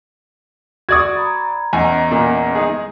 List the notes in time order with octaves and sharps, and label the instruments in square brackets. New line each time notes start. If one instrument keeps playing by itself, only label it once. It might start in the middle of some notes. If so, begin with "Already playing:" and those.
[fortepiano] F#4 D5 C#6 [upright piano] D#6 G#6
[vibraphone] A#5 B5
[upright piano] E2 [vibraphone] C#4 D#5 A#5 [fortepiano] G#5
[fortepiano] A#2
G#3 D#4 G#4